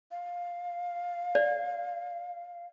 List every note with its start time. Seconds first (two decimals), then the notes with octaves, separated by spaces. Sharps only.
0.11 F5
1.35 D5